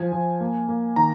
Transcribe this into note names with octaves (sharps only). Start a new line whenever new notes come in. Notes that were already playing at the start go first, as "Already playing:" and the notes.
Already playing: F3 G#5
F3
A#3
A#3
D#3 A#5